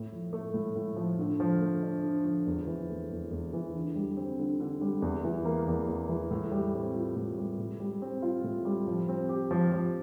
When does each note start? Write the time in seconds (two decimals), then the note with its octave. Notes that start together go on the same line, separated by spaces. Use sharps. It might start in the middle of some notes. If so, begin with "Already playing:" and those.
Already playing: A2
0.12 F3
0.33 A3
0.54 A2
0.76 A2
0.96 F3
1.19 D3
1.40 F3
1.61 A3
1.83 D4
2.04 D3
2.24 F3
2.46 E2
2.67 E3
2.90 A3
3.11 E2
3.31 E2
3.53 E3
3.74 D3
3.95 G3
4.17 C4
4.39 D3
4.60 D3
4.81 G3
5.02 E2
5.24 E3
5.45 A#3
5.67 E2
5.88 E2
6.09 E3
6.31 A2
6.52 G3
6.74 C4
6.95 F4
7.16 A2
7.38 G3
7.58 A2
7.80 G3
8.02 C4
8.22 F4
8.44 A2
8.65 G3
8.87 F3
9.09 C4
9.29 G4
9.51 F3
9.72 F3